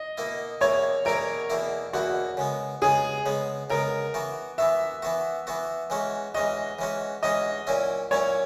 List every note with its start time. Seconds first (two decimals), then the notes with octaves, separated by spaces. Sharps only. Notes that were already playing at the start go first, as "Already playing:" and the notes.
Already playing: D#5
0.17 B2 A#3 E4
0.61 E2 B2 A#3 E4 C#5
1.05 E2 B2 A#3 E4 A#4
1.50 E2 B2 A#3 E4
1.93 E2 B2 A#3 E4 F#4
2.37 C#3 G#3 B3
2.82 C#3 G#3 B3 G#4
3.26 C#3 G#3 B3
3.70 C#3 G#3 B3 A#4
4.14 E3 B3 F#4
4.58 E3 B3 F#4 E5
5.02 E3 B3 F#4
5.47 E3 B3 F#4
5.90 E3 G#3 C#4 F#4
6.35 E3 G#3 C#4 F#4 D#5
6.79 E3 G#3 C#4 F#4
7.23 E3 G#3 C#4 F#4 D#5
7.67 A#2 F#3 C#4 E4
8.11 A#2 F#3 C#4 E4 C#5